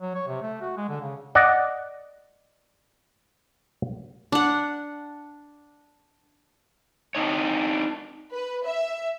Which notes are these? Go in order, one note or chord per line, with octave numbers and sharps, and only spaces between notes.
F#3
C#5
C3
A3
F#4
G#3
D3
C#3
D5 D#5 F#5
D4 F#5
C4 D4 D#4 C#5
B4
E5